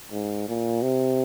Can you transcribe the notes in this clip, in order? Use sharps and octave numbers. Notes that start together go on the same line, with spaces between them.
G#2
A#2
C3